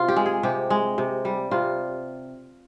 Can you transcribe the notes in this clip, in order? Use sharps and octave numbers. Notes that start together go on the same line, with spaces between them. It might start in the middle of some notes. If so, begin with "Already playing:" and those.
Already playing: C3 F4
G4
G#3
G#4
C3 G4
G#3
C3
G3
C3 F4